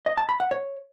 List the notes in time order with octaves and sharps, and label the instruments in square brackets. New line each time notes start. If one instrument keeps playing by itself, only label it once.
[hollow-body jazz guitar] D#5
A5
B5
F#5
C#5